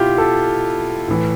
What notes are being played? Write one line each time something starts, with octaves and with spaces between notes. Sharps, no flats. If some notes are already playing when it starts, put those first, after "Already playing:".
Already playing: B2 E4 F4 G4
A4
A2 E3